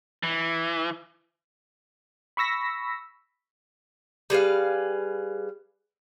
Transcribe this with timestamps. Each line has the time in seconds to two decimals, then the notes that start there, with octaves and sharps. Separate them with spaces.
0.23 E3
2.37 B5 C#6 E6 A#6 B6
4.30 G3 G#4 B4 F5